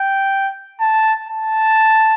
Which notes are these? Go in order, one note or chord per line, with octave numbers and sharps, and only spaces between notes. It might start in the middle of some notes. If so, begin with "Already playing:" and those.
Already playing: G5
A5
A5